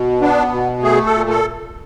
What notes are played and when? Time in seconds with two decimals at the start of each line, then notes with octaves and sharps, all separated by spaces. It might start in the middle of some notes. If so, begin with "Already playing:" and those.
Already playing: B2
0.21 B3 D4
0.52 B2
0.83 A3 G#4
1.06 A4
1.13 A#2
1.30 A4